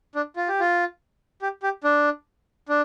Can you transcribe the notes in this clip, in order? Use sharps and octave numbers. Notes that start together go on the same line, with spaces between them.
D4
F4
G4
F4
G4
G4
D4
D4